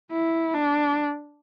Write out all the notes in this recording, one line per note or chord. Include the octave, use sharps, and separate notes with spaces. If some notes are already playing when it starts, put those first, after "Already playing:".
E4
D4